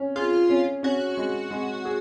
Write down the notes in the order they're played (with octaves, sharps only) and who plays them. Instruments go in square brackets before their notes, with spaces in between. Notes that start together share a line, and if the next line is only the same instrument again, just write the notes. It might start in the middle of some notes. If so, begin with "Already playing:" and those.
Already playing: [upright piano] C#4
[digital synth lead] F4 [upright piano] G#4
[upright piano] C#4
[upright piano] C#4 [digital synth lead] F#4
[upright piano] G#3
G#3
G#4